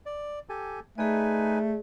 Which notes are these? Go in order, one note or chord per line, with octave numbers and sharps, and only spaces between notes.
D5
G4 A4 G#5
A3 D#4 G#4 B4 D5 G#5